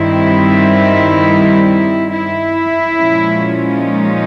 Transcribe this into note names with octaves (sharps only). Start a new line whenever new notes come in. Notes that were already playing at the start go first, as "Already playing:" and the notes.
Already playing: G2 D#3 G3 C4 D#4 E4
E4
A#2 F3 G#3 C#4
D#4